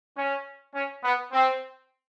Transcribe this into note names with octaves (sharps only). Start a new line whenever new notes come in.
C#4
C#4
B3
C4